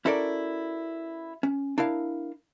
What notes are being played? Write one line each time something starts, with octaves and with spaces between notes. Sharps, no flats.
C#4 E4 F#4 A4 A#4 D5
C#4
D4 E4 A#4 F5